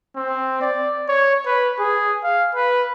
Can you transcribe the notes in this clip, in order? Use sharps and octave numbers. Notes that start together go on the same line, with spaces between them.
C4
D5
C#5
B4
G#4
F5
B4